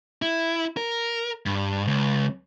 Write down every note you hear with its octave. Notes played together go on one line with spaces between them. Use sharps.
E4
A#4
G2
C#2